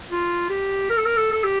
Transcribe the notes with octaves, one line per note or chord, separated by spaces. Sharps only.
F4
G4
A#4
A4
A#4
A4
A4
G4